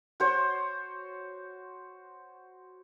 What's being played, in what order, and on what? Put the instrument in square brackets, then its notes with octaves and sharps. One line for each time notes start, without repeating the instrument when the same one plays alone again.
[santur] F#4 C5 C#5